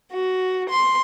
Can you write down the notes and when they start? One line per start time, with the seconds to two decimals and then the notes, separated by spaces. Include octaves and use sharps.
0.11 F#4
0.68 C6